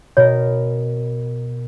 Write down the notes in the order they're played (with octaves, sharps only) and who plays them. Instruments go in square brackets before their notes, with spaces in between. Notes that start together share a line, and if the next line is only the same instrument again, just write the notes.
[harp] B2 A#4 [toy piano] C#5